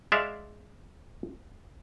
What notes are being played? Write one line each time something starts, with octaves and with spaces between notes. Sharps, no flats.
G#3 D5 E5 F5